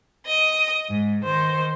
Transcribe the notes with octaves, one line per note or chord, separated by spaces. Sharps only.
D#5 D#6
G#2
D#3 C5